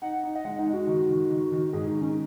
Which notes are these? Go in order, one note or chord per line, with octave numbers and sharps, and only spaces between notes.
D#4 F#5
D#4
D#5
G#3 F#5
D#4
G#3
F#4
D#3
D#3
D#3
D#3
G#2 G#4
D#4
D#3
C#4